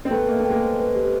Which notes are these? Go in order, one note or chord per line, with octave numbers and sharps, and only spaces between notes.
C4
A3 B3 G5
A#3 D#5
A3
G5
G#3 A#3
C5
B4
G4